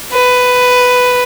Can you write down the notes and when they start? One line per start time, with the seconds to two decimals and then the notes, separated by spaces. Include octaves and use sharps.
0.12 B4